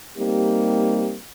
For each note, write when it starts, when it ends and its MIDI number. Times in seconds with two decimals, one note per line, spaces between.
0.18 1.16 55
0.18 1.16 58
0.18 1.16 60
0.18 1.16 63
0.18 1.16 67